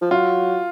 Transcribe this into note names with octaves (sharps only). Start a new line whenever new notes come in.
F3
F#3 F4